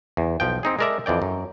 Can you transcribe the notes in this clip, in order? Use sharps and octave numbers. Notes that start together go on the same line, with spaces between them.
E2
B1 F3 G5
C4 D#4 G#4
G#3 A4 A#4 D5 E5 A#5
F2 E3 D5 G5
F#2